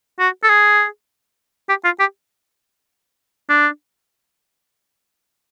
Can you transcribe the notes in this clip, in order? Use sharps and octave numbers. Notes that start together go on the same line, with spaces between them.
F#4
A4
G#4
G4
F4
G4
D4